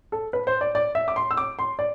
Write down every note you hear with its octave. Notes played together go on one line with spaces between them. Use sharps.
A4
B4
C5
D5
D5
E5
D6
C6
E6
D6
C6
D5